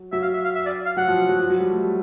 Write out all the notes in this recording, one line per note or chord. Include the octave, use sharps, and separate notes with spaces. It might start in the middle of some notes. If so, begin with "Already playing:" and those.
Already playing: F#3
F#3 E5
F5
E5
F5
E5
D5
F5
F#3 F#5
F3
F#3
F#3
F3
F#3
G3
A3